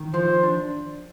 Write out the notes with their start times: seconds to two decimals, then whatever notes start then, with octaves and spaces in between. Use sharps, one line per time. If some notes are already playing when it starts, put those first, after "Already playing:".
Already playing: D#3
0.14 F3 C5
0.43 D4